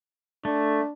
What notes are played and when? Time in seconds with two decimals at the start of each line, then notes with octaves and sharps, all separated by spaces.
0.45 A3 D4